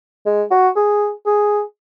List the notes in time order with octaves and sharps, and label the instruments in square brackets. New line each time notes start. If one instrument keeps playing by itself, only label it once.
[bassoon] G#3
F#4
G#4
G#4